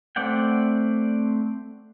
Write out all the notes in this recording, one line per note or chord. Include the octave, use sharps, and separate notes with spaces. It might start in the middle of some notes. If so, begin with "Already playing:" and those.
A3 C4 D5 F#5 G5